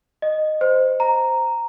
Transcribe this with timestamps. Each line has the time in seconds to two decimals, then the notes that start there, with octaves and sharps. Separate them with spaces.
0.22 D#5
0.61 C5
1.00 A#5